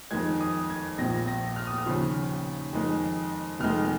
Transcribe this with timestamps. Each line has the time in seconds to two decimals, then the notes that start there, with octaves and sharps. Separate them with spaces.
0.11 F2 D#3 G#3 G#6
0.41 D#6
0.70 G#6
0.98 A#1 A#2 F3 A#6
1.27 A#6
1.56 F6
1.67 D#6
1.78 F6
1.86 D#2 C#3 F3
2.73 F2 D#3 G#3
3.60 F1 F2 D#3 G#3 F6